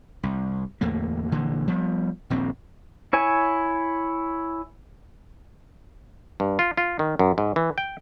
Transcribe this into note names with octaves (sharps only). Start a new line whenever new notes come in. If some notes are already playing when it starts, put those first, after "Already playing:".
C2
D1 E2 A3 A#3
A#1 D3 E3 A#3
F3 G3 B3
D#1 A#1 C4
E4 C#5 G#5
G2
F4
F4
D#3
F#2
G#2
E3
G5